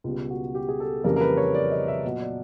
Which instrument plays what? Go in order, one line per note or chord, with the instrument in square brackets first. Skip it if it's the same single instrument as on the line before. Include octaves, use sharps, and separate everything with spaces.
[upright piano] C#2 B2 G3 F4
F#4
G4
G#4
A4
F2 C#3 E3 G3 A#3 A#4
A#4
B4
C#5
D5
D#5
E5
A#2 F#3 B3 D#5
D5